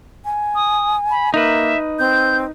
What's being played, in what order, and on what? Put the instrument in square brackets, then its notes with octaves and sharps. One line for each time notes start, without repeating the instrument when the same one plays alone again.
[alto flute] G#5
[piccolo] D#6
B5
[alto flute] A#3 [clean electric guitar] D#4 B4 [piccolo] E5
[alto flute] C4 [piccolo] G6